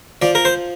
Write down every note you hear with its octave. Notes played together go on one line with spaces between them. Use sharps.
F3 D5
A#4
C5